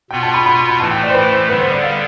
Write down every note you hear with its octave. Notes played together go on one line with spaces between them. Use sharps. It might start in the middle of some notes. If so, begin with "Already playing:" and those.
B2 B3 F4 G5
A5
B5
B5
B5
A2 E3 A3 A5
G5
D5
C5
B4
C5
D3 G3 B3 B4
C5
D5
F5